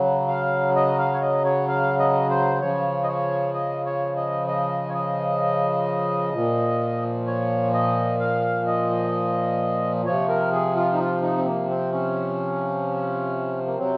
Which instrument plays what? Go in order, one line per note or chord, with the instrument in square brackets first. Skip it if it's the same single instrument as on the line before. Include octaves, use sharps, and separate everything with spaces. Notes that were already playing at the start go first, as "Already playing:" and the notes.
Already playing: [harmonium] C#3 F#3
F5
D#5
F5
C#5
D#5
C#5
F5
D#5
C5
C#3 F3 C#5
D#5
C#5
D#5
C#5
D#5
D#5
C#5
D#5
A#2 F3
C#5
D#5
F5
D#5
C3 F3 C#5
A#4
G#4
F4
D#4
F4
D#4
C4
A#3
C4
C#4
A#3
C3 F#3 C4